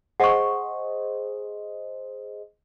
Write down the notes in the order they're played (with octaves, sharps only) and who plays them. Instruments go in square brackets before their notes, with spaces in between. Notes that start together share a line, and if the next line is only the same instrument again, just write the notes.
[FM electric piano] G#4 C5 D#5 [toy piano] F#5 C#6